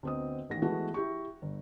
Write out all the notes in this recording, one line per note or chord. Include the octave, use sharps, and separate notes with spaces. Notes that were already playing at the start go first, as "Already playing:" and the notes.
D2 B3 C4 D#5 D#6
A1 D#3 A#6
E3 G#3 A3 B3 F#4
E4 G4 C#6
G1